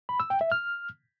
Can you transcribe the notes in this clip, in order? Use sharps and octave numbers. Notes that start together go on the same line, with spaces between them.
B5
E6
G5
E5
F6